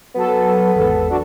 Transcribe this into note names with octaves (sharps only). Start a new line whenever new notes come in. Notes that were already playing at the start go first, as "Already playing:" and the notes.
F#3 B3 A4
G#1 E2 A4
D4 F#4